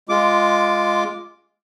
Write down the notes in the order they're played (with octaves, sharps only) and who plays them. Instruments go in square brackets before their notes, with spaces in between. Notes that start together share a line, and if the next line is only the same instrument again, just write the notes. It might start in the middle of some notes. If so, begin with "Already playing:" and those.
[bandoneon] G#3 F4 D6